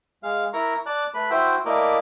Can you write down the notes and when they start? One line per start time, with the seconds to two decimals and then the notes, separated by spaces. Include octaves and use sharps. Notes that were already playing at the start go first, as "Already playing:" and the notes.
0.23 G#3 F5
0.53 E4 A#4 A#5 C#6
0.86 D5 A5 F#6
1.14 A3 B4 B5
1.30 E4 F#4 C5 E5 G5
1.65 A3 A#3 E4 A#4 D5 D#5